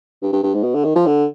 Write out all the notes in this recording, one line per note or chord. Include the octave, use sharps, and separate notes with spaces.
G2
G2
G2
G#2
B2
D3
D#3
F3
D3